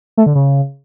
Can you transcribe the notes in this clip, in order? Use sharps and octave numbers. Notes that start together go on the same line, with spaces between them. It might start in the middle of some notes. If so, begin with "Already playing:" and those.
A3
D3
C#3